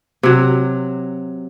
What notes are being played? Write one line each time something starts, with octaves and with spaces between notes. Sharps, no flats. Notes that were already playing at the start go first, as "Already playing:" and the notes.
C3 F#3